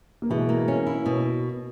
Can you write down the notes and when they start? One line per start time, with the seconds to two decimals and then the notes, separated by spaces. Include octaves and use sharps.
0.22 A#3
0.30 B2 E3 G#3
0.49 A#3
0.68 C#4
0.87 E4
1.06 B2